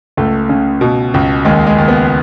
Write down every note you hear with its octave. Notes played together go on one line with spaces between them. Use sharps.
C#2 A3
C#3
B2
C#2
D#2 G#3
G#3
D#2
B3